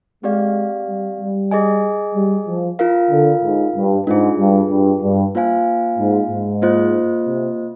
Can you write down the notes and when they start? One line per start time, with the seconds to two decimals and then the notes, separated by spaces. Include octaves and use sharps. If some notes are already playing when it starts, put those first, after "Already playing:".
0.23 G#3 C4 G4 D5 F5
0.87 G3
1.20 G3
1.51 G#4 D#5 G#5
2.15 G3
2.47 F3
2.79 F4 A#4 F5
3.11 D3
3.43 G#2
3.75 G2
4.07 G#2 D4 F4 G#4
4.38 G2
4.70 G2
5.02 G2
5.35 A#3 F4 C5 F5 G#5
5.98 G#2
6.30 G#2
6.62 A#3 F4 C5 D#5
7.27 C3